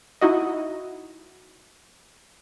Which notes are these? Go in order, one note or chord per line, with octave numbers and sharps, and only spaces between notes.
D#4 E4 F#4 D#5